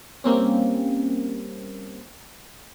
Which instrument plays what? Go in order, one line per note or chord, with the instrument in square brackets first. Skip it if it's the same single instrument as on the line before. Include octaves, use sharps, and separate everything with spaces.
[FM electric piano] G3 A#3 C4 C#4